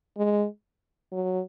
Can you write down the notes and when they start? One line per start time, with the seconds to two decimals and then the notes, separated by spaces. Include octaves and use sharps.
0.17 G#3
1.12 F#3